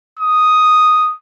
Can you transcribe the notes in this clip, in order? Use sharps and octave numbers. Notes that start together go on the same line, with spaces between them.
D#6